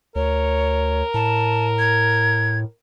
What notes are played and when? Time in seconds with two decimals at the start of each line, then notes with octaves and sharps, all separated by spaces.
0.16 D2 A#4 C#5
1.14 A2 A5
1.79 G#6